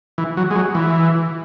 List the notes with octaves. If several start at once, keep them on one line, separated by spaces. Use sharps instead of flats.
E3
F#3
G#3
F#3
E3